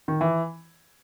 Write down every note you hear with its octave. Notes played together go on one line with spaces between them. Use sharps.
D#3
E3